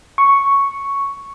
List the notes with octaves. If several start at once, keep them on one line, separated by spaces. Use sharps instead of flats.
C#6